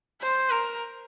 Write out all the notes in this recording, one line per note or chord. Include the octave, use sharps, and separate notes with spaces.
C5
A#4